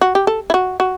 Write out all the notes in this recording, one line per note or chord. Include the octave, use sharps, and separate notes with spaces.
F#4
G4
A4
E4
F#4
F#4